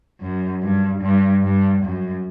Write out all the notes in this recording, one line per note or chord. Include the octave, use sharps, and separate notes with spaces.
F#2
G2
G2
G2
F#2